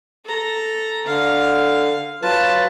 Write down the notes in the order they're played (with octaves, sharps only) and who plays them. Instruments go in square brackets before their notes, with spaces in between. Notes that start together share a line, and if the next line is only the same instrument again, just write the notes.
[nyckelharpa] A4 A#5
[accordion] D3 [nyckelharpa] F5
[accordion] F#3 F4 B4 [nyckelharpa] A5